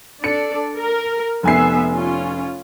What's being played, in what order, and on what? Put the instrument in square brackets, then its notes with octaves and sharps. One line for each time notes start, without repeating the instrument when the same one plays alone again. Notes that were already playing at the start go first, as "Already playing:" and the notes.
[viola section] D4 A4 D5 [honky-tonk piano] C#7
[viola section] A#4
[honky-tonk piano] F1 G#5 C7 [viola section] B3 E5
[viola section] C#4 F4